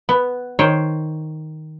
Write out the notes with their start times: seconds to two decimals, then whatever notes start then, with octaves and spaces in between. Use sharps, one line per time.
0.09 B3
0.59 D#3 C5 C#5